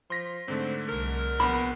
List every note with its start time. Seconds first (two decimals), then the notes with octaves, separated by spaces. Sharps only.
0.10 F3 C6 A#6 B6
0.48 G#2 D3 A3 C4
0.89 C2 A#4
1.40 A#1 A#3 B3 B5